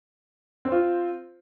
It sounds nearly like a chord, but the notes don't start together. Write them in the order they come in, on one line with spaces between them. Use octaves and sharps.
C4 C5 F4